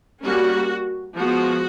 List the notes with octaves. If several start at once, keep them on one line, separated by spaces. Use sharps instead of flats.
G3 A#3 C#4 F#4
F3 G#3 B3 F#4